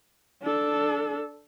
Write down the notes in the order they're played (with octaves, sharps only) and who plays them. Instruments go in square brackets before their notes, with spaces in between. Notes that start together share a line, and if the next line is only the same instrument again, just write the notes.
[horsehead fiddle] D4 A4